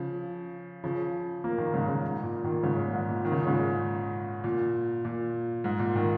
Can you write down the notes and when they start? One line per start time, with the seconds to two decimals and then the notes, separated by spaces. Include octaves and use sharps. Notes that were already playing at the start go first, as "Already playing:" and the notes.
Already playing: C#3 F3
0.84 C#3 F3
1.44 F3 A#3
1.58 A#2 D#3
1.73 G#2 C#3
1.88 G#2 C#3
2.23 A#2
2.44 A#2 D#3
2.63 G#2 C#3
2.79 A#2
2.93 G#2
3.09 A#2
3.25 D#3
3.32 C#3
3.39 A#2
3.47 G#2 C#3
4.44 A#2
5.05 A#2
5.64 G#2
5.79 A#2
5.95 A#2 D#3